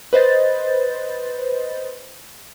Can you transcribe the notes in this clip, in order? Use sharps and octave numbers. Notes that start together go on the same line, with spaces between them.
B4 C5 D#5 A6